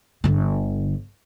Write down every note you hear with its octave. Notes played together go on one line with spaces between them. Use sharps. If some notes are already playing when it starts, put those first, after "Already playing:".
G1 D3